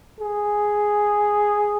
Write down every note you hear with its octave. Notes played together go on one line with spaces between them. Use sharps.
G#4